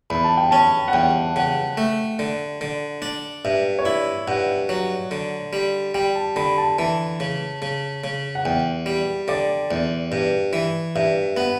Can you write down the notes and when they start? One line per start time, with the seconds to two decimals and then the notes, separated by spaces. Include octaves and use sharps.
0.10 E2 B5
0.24 A5
0.37 G5
0.51 C#4 A5
0.88 F#5
0.93 E2 G5
1.36 C#3 F#5
1.77 A3
2.19 D3
2.61 D3
3.02 D4
3.45 G2 E5
3.79 C#5
3.85 E4 D5
4.27 G2 F#5
4.69 F#3
5.11 D3
5.53 G3
5.94 G3 G5
6.15 A5
6.36 D3 B5
6.58 A5
6.78 E3 A5
7.20 C#3
7.62 C#3
8.04 C#3
8.35 F#5
8.45 E2 G5
8.86 G3
9.28 D3 D5
9.71 E2
10.12 G2
10.53 E3
10.96 G2 E5
11.37 B3 F#5